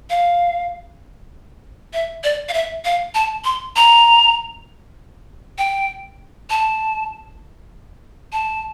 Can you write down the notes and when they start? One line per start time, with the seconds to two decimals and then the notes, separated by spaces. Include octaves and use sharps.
0.10 F5
1.93 E5
2.24 D5
2.49 F5
2.54 E5
2.85 F5
3.15 A5
3.45 C6
3.76 A#5
5.58 G5
6.50 A5
8.32 A5